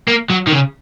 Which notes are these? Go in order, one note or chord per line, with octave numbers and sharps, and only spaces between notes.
A#3
F#3
D#3
C#3